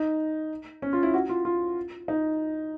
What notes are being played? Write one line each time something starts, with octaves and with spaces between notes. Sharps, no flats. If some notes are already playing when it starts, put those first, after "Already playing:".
Already playing: D#4
C#4
F4
E4
F#4
F4
F4
D#4